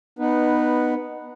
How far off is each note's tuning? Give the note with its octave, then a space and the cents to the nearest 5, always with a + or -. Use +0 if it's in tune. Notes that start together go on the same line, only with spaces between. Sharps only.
B3 +0 D#4 -20 B4 -5